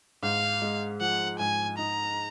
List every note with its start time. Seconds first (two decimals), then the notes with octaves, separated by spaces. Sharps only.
0.23 G#2 F5
0.62 G#3
1.00 F3 F#5
1.39 G#2 G#5
1.78 D#4 A#5